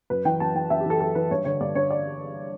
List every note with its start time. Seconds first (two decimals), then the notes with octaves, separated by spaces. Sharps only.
0.10 F#2 B4
0.25 E3 G5
0.40 F#2 A5
0.55 E3 G5
0.70 F#2 E5
0.80 G4
0.86 E3 A4
1.00 F#2 A4
1.15 E3 B4
1.31 G2 C#5
1.45 D3 C#5
1.61 G2 D5
1.75 D3 C#5
1.91 D5